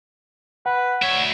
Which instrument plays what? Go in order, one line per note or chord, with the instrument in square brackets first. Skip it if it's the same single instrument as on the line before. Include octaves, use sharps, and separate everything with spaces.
[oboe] B4 [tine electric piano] F#5
[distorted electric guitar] D2 E5 [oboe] C#5